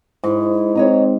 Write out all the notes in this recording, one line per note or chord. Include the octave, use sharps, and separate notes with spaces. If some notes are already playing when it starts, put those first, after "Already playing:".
G#2 E4
C4 C#5 D#5 A#5